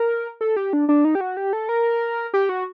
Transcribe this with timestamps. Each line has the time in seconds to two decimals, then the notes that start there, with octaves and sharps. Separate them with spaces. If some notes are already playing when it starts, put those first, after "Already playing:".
Already playing: A#4
0.41 A4
0.56 G4
0.73 D4
0.89 D4
1.05 D#4
1.15 G4
1.21 F#4
1.37 G4
1.53 A4
1.69 A#4
2.34 G4
2.49 F#4